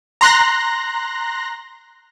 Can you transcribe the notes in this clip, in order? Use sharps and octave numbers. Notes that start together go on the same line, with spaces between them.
A#5 C6 F#6 A#6